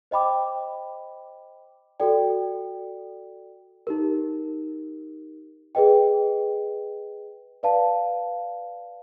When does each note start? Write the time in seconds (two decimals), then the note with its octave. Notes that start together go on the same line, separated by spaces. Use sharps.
0.11 C5 D#5 G5 B5 D6
2.00 F#4 A4 D5 G5
3.87 D#4 G4 A#4
5.75 G#4 B4 D#5 G5
7.63 B4 D5 F5 A5